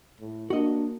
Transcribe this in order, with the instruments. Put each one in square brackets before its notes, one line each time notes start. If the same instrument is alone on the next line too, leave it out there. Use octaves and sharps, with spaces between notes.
[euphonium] A2
[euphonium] A#3 [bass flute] D4 [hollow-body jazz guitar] F#4 D#5